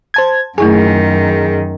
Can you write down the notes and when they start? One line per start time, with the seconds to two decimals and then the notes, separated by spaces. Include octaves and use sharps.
0.14 C5 A5 G#6
0.58 F#2 D#3 A3 E4 G#4 G#5